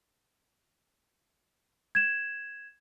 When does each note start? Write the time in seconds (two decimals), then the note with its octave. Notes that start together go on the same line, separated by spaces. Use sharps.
1.95 G#6 E7